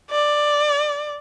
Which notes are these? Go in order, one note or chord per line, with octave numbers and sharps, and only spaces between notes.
D5